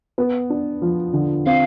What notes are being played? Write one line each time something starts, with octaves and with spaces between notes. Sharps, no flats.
B3
D4
F3
D3
C4 F5